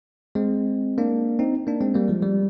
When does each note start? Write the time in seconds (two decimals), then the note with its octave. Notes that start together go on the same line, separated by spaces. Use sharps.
0.35 G#3 C4
0.98 A#3 D4
1.39 C4 D#4
1.67 A#3 D4
1.81 G#3 C4
1.94 G3 A#3
2.08 F3 G#3
2.23 G3